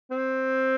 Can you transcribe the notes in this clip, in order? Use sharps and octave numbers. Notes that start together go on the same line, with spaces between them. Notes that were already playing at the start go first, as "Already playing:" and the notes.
C4